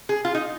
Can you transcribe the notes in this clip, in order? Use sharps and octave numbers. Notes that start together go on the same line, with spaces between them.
G#4
F4
D#4